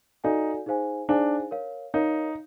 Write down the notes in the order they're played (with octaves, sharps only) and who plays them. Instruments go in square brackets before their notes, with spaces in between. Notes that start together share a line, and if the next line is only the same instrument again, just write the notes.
[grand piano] D#4 [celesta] F#4 A4 D5 F5 G#5
[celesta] D#4 G#4 C5 F5 G#5
[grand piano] D4 [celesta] D#4 G#4 C5 F5 G#5
[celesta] A#4 C#5 F5
[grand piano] D#4 [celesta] A#4 C#5 F5